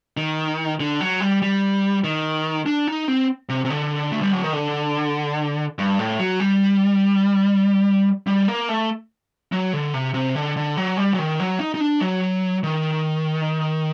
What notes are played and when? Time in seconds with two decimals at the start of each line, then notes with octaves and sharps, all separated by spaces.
0.17 D#3
0.80 D3
1.01 F#3
1.20 G3
1.42 G3
2.04 D#3
2.66 D4
2.88 D#4
3.08 C4
3.49 C3
3.65 C3
3.70 D3
4.12 A3
4.22 G3
4.33 F#3
4.43 D#3
4.53 D3
5.79 G2
5.99 A2
6.19 F#3
6.40 G3
8.27 G3
8.48 A#3
8.69 A3
9.52 F#3
9.73 D3
9.94 C3
10.14 C3
10.35 D3
10.57 D3
10.77 F#3
10.97 G3
11.14 F#3
11.19 D#3
11.40 F#3
11.60 D#4
11.74 D#4
11.80 D4
12.01 F#3
12.63 D#3